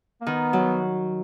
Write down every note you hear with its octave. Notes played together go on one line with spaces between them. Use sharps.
A#3
D#3 B3
F#3